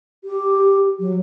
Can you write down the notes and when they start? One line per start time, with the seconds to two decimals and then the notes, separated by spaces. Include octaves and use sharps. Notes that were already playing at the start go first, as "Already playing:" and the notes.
0.24 G4
1.00 F#3